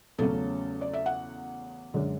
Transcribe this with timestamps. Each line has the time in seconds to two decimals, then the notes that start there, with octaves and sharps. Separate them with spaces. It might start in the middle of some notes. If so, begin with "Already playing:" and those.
0.18 E2 C#3 F#3 A3 C#4 A4
0.81 D5
0.93 E5
1.06 F#5
1.94 F#2 D3 G#3